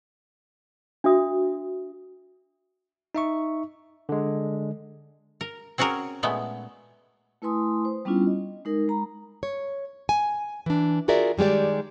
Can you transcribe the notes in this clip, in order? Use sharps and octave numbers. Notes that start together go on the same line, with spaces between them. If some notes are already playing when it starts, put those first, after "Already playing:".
D4 F#4 E5 D#6
D#4 E5 C#6
D3 G#3
A#4
C4 C#4 F#4 G#4 A#4
A#2 G#3 A3 B3
A3 E4 B4 G#5 C6 D#6
C5
G3 B3 C#4 D4 E4 F4
D#5
G#3 D#4 A#4
G#3 A#5 B5
C#5
G#5
E3 D4
F4 F#4 G#4 A#4 D5 E5
D#3 G3 G#3 G4 D5